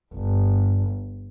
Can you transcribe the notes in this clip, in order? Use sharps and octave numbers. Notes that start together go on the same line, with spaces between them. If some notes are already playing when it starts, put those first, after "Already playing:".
G1